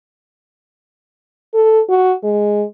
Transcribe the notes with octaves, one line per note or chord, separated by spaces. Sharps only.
A4
F#4
G#3